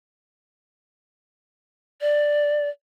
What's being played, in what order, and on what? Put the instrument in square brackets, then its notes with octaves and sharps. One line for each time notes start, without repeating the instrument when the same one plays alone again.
[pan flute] D5